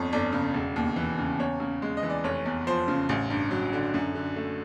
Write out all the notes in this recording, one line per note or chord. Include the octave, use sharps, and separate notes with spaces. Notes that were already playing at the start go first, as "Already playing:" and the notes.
Already playing: G1 F2 C#5
G1 D5
C#3
E1
D#2
E3
C#3
E2 C#5
C#3
G#3
D#5
E3
D5
F1 C#5
E2
F3 C5
C#3
A1
G2
F#3
D3
F#2
D3
A3